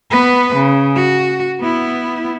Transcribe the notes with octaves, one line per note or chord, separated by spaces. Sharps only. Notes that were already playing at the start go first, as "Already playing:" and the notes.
B3 B4
C#3
F#4
B3 E4